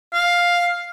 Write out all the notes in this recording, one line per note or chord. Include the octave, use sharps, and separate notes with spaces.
F5